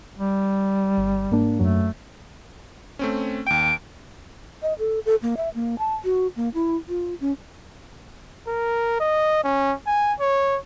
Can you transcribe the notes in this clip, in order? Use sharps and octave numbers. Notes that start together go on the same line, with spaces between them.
G3
G1
G#2 A#3 D4
F#2 F#3 A3
A3 C4 C#4
D#2 G5 D7
D#5
A4
A4
A#3
E5
A#3
A5
F#4
A#3
E4
F4
C#4
A#4
D#5
C#4
G#5
C#5